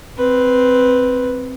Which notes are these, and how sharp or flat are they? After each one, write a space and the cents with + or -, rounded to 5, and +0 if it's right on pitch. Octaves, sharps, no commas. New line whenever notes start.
C4 +0 B4 +0